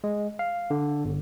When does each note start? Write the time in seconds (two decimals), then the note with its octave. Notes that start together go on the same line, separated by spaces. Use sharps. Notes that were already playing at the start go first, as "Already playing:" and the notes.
0.04 G#3
0.39 F5
0.70 D3
1.05 G1